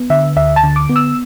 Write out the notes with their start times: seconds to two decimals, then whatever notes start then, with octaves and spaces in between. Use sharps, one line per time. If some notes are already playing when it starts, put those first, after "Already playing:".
Already playing: B3
0.10 D3 E5
0.36 D2 E5
0.56 A5
0.64 D3
0.76 D6
0.89 B3
0.96 E6